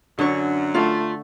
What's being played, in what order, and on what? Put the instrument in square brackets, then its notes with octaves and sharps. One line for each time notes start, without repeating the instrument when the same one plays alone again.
[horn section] F#2 F#3 [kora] D3 C#5
[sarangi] A3 [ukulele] F4